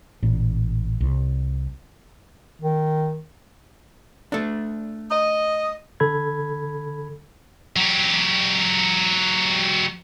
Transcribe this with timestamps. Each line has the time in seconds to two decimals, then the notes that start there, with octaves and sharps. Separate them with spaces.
0.23 A1 A#2
1.00 C2
2.61 D#3
4.32 A3 D4
5.11 D#5
6.00 D3 A4 B5 G#6
7.76 F#3 G4